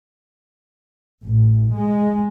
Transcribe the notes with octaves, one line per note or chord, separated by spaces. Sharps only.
A1
G#3